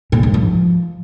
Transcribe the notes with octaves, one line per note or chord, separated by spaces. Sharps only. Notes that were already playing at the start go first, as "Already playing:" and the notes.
A#2
G#2
F3